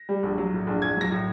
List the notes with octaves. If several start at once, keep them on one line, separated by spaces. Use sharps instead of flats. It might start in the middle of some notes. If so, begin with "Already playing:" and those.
Already playing: A#6
G3
A#1
F#3
A2
A#1
A#1 G#6
F#3 A#6
A2